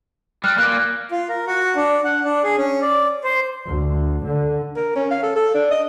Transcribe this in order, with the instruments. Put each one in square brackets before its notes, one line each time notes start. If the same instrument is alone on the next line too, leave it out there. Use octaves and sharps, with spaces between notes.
[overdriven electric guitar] G3 [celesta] F6 F#6
[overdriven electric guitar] A#3 D5 [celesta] F#6
[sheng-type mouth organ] F4
A#4
F#4
D4
F#5
D4
G#4
C#4
D5
C5
[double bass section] D2
D3
[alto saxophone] A#4
C#4
F5
A4
A4
D4
D#5